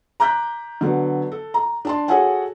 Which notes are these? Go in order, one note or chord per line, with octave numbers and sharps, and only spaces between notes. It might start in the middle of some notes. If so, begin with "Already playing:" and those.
A#5 D6 F#6 G6 B6
D3 F#3 B3
A4
A#5
D4 A5 C6
F#4 G#4 A4 C#5 F#5 G#5